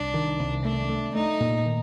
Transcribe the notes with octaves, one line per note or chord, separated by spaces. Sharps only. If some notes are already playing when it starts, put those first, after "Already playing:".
Already playing: C2 D4
D#3
C2
A3 D4
A3
A3 D#4
A#2
D#3